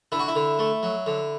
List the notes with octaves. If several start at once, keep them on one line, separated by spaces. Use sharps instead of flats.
D3 E4
F#4
E4
D3
A3
F#3
D3